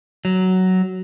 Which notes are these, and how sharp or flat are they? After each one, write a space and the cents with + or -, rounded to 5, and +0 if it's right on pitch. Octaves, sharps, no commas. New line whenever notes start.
F#3 +10